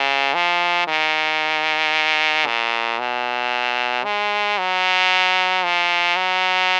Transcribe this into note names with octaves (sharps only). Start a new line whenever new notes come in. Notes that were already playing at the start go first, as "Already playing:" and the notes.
Already playing: C#3
F3
D#3
A#2
B2
G#3
F#3
F3
F#3